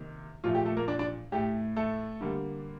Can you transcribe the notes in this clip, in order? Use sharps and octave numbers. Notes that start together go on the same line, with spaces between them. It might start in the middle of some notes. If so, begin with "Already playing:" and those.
Already playing: C3 D#3 A#3
A#2 F3 A3 F4
G4
A3 A4
A#3 A#4
D4 D5
D4 D5
A2 A3 G4
A3 A4
D3 G3 A#3